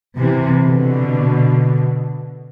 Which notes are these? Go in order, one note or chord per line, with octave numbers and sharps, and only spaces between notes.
C3 E3
B2 D3